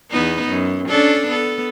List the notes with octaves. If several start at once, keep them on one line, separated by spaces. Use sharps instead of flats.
E2 B3 D#4
F#2
C#4 D4 A4
B3 A4